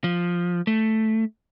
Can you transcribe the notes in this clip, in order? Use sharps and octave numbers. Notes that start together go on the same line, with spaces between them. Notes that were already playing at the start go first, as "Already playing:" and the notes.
F3
A3